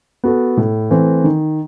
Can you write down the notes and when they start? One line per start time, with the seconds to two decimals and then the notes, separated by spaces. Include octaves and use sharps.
0.24 B3 F#4 A4
0.57 A2
0.91 E3 A3 C4
1.24 D#3